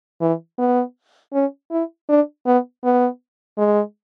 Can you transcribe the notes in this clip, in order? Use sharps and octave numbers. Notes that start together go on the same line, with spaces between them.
E3
B3
C#4
E4
D4
B3
B3
G#3